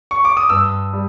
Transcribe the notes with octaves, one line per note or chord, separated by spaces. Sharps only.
C#6
D6
D#6
G2 E6
G3